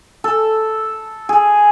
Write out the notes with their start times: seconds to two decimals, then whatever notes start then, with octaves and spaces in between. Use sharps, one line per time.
0.24 A4
1.29 G#4